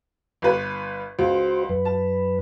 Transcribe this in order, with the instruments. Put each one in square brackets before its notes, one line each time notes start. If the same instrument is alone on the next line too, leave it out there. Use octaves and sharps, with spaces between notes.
[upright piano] G1 B4
[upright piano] C#2 [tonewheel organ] F#4 C5
[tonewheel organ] F#2 B4
[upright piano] A5